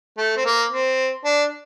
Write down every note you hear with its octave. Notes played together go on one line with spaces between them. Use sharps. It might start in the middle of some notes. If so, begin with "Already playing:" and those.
A3
C4
A#3
C4
D4